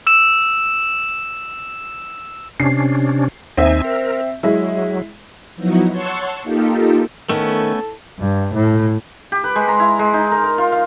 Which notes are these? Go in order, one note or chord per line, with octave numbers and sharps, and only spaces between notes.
E6 E7
C3 C#4 D4 C7
D#2 C4 D#4 E5 G#5
A#4
F#3 G#3 E4
F3 F#3 B3 D#4 E4 F#4
C#5 F#5 A5 C6 C#6 E6
A#3 D#4 F4 G4 A4
D#3 A3 B3 C#4 A4
G2
A2
G4
B4
G#3
A#5
E4
G#3
D#4
A#4
A#4
F4
F5